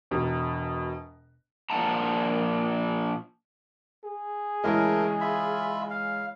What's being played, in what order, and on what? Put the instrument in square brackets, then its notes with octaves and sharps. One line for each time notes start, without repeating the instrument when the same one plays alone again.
[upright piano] E1 B2
[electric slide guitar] A#2 F3 B3 F#5 A5 A#5
[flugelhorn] G#4
[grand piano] C#3 E3 G#3 [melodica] A3 A#4
[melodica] F4 E5 B5
F5